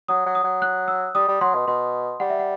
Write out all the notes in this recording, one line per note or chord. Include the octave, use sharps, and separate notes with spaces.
F#3 D#6
F#3
D#6
F#3
F#6
E6
G3 D#6
G3
F#3 C6
B2
B2 C6
G3 F#5
E5
F#5